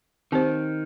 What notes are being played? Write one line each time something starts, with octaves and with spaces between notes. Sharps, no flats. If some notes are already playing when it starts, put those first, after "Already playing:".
D#3 C4 G4 C5